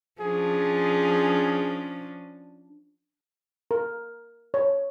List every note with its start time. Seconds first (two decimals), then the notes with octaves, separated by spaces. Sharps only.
0.21 F3 C#4 D4 G#4
3.71 A#4
4.54 C#5